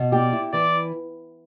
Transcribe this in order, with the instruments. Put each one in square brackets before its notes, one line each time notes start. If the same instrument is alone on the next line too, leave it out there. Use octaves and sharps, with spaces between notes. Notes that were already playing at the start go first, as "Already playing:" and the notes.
Already playing: [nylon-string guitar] B2
[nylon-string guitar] G4 [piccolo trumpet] D5
[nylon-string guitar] E4
[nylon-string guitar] E3 [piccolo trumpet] D5